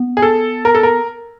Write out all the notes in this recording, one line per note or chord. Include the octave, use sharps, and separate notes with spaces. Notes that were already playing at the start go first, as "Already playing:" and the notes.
Already playing: B3
G#4
A4
A#4
A4
A#4